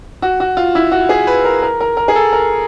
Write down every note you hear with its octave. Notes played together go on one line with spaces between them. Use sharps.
F#4
F#4
F4
E4
F#4
G#4
B4
A#4
A#4
A#4
A#4
G#4
A4
A#4